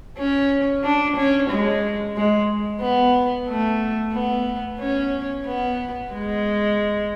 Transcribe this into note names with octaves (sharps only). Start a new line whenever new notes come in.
C#4
D4
C#4
G#3
G#3
B3
A3
B3
C#4
B3
G#3